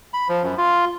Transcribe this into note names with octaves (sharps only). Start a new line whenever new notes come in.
B5
F3
F#2
F4